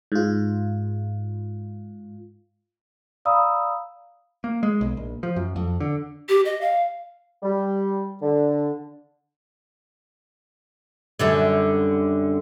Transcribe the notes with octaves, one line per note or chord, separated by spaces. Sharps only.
G#2 F4
D5 F5 A#5 B5 D#6 E6
A#3
G#3
B1
A#1
F3
F#2
F2
D3
G4
D#5
F5
G3
D3
F#2 D3 G3